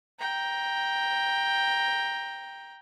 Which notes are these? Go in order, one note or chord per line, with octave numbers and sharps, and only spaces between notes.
G5 A#5